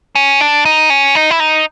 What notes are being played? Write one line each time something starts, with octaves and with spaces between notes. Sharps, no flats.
C#4
D4
D#4
C#4
D#4
E4
D#4